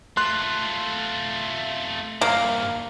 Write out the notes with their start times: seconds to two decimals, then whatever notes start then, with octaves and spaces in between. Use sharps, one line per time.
0.17 A3 F4 C6 F#6
2.21 G2 A#2 A#3